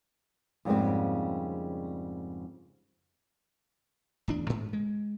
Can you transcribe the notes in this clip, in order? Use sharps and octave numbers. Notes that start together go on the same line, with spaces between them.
F2 G#2 C#3 G3 A#3 C4
D1 E2 D4
D2 G#2
G#3